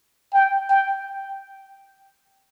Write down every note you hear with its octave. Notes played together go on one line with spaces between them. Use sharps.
G5
G5